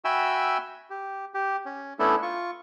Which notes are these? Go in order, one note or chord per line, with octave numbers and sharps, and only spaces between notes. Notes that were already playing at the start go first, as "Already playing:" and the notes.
F#4 E5 G5 G#5 B5 E6
G4
G4
C#4
A3 B3 C#4 D4 E4 A4
F4 C#6